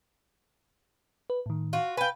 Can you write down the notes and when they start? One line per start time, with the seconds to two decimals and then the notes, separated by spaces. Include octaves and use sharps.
1.30 B4
1.46 A2 D#3
1.73 F4 F#4
1.97 B4 F5 G5 G#5